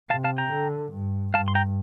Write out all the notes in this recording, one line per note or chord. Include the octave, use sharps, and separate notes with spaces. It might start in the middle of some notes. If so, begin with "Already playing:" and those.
C3 F5 A5
F5 A5
G5 A#5
D3
G2
G2 F5 A5
C6
G5 A#5